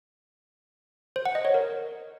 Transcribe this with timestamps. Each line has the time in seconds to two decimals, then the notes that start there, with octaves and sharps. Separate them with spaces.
1.16 C5
1.25 F#5
1.35 D#5
1.45 C#5
1.54 A#4